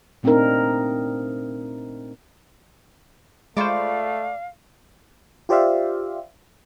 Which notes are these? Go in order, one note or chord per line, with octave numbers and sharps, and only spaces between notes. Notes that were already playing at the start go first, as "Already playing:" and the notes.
A#2 A3 C4 D4 D#4 A#4
G#3 A3 F4 C5 D5 F5 B5 C#6
F4 G4 C5 D5 E5 F5